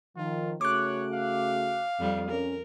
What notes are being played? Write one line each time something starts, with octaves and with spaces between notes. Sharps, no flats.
D#3 F3 F4
C#3 A3 F#4 C#5 D6 F#6
F5
F2 G3
C#4 A#4